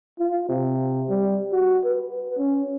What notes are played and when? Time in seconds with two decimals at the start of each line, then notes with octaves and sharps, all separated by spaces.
0.19 F4
0.49 C3
1.09 G3
1.52 F#4
1.85 B4
2.38 C#4